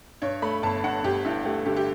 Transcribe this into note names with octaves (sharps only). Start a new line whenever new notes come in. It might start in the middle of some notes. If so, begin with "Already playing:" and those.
G2 C#5
A3 B5
G1 A5
G2 F#5
G1 G4
G2 E4
A3 G4
D3 G4
G4